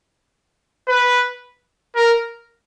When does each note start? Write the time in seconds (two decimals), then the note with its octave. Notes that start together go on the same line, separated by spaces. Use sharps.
0.88 B4
1.96 A#4